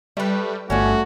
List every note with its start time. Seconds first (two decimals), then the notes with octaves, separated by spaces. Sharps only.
0.17 G3 A3 B4
0.70 G1 A3 C#4 F#4 G4 D5